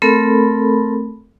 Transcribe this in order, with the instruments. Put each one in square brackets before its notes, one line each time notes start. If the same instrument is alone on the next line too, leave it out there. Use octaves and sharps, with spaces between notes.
[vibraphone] A3 C4 A4 A#4 B5